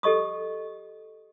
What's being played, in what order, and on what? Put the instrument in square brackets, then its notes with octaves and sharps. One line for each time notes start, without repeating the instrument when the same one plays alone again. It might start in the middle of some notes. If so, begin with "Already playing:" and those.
[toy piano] G4 A4 D#5 C#6 D#6